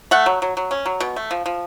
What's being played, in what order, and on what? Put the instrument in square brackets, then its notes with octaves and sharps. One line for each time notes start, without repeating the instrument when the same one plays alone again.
[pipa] A3 F#5
F#3
F#3
F#3
C#4
F#3
B2
A3
F3
F3